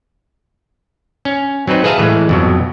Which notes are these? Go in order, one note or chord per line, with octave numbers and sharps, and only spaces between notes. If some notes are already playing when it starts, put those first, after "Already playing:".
C#4
F#3 C4 D#4 B4
G#4 B4 E5 F5 A5 A#5
A2 E3 G#3
F2 B2 F#3